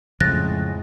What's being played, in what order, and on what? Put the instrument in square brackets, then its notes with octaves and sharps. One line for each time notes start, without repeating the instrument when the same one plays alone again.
[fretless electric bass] F2 C#3 F3 [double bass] A2 G#3 [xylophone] F#6 A6 A#6